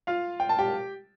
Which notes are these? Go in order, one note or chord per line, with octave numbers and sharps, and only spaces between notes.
F4 F5
G5
A5
G4 G5